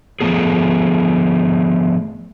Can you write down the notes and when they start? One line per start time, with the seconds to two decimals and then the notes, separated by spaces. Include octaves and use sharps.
0.21 F3 F#3 A3 B3 G#4